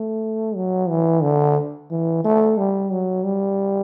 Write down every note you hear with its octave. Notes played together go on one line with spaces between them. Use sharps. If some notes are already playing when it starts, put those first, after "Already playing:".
Already playing: A3
F#3
E3
D3
E3
A3
G3
F#3
G3